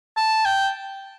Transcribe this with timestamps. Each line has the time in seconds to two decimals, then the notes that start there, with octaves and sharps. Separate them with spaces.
0.17 A5
0.45 G5